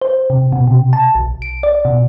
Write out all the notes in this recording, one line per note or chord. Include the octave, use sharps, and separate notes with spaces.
C5
C3
B2
C3
A5
B1
D7
D5
B2